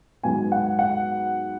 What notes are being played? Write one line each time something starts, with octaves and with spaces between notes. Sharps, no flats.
G#2 F#3 B3 G#5
F#5
F#5